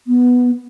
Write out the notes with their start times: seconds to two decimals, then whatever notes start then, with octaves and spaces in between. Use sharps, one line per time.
0.07 B3